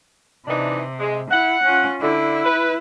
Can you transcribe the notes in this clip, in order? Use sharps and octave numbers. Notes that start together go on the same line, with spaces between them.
C3 E3 D4 D#4
G#3
E4 F#5
C#4 F4
D3 E4
B4